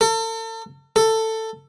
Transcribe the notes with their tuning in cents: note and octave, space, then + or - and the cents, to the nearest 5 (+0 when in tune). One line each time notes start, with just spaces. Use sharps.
A4 +40
A4 +15